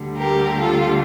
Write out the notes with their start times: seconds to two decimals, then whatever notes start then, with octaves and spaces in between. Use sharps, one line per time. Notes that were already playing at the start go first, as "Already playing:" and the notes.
Already playing: D2 D3 G3
0.17 G4 A#4
0.60 F4 A4